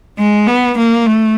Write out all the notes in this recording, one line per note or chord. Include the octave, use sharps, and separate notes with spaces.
G#3
B3
A#3
A3